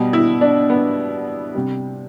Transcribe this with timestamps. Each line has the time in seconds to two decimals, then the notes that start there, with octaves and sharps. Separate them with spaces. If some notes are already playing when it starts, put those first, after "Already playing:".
Already playing: B2 G3
0.13 E4
0.41 D4
0.70 B3
1.55 C3 G3